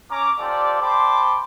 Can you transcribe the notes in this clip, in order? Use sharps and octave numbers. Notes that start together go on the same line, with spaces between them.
C#4 A#5 D6
F4 G4 A4 C5 D5
C5 G5 A5 B5 C6 D6